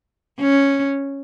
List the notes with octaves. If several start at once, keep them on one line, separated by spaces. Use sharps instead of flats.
C#4